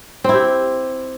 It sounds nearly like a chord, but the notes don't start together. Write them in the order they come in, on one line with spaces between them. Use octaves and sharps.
C4 E4 G4